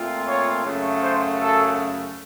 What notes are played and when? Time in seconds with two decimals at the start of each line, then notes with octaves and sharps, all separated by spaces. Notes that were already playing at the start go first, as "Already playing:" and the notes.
Already playing: A#2 A3 C4 F4
0.28 C#5
0.65 F#2 C#3 A3
1.03 C5
1.40 A4